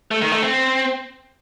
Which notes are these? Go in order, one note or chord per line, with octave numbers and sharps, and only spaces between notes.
A3
D#3
A3
C4